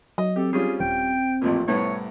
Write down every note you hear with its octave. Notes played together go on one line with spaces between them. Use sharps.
F#3 D#5
C4 G4 A4
G3 C#4 F4 G#4
D#1 G5
A1 F2 A#2
C2 A2 B3 C#5